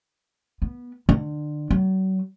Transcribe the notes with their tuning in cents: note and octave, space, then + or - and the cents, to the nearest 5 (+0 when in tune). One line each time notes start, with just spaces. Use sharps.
B3 -15
D3 +25
F#3 +40